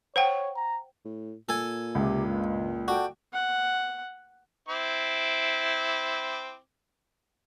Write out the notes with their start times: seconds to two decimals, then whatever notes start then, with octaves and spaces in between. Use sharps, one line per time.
0.16 C5 C#5 F#5 G5
0.56 A#5
1.05 A2
1.49 A#2 A4 G#5
1.95 C#2 C3
2.25 G2 C#3 G#3
2.88 F#4 A4 D5 G5
3.33 F#5
4.68 C4 E4 D6